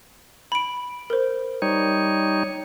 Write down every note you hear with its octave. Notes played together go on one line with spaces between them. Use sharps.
B5 D7
A#4 C5
G3 D#4 C#5